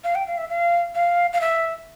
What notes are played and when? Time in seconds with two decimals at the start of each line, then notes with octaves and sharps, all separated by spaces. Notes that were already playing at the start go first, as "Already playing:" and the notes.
0.04 F5
0.15 G5
0.27 F5
0.37 E5
0.50 F5
0.95 F5
1.33 F5
1.41 E5